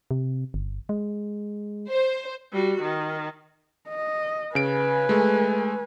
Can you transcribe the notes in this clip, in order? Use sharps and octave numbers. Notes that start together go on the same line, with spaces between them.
C3
G1
G#3
C5
G3 F#4
D#3
D#5
C#3 B4 G#5 D7
G#3 A3